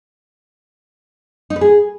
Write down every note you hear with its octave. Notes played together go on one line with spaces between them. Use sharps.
D#4
B4
G#4